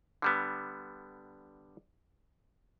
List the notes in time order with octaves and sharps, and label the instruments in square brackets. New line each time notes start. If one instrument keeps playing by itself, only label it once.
[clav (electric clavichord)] D3 G3 B3